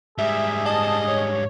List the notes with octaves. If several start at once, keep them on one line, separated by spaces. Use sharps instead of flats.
G#2 G3 G#4 E5
D#5 A5
C#5